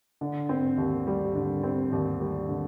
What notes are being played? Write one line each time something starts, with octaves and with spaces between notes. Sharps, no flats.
D3
C4
D#2
G3
D3
C4
D#2
G3
D3